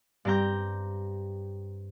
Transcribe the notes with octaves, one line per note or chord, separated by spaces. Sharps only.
G2 C4 G4 A#5 G6